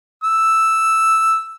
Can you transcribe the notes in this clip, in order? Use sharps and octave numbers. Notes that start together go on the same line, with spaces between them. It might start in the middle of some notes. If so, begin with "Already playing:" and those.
E6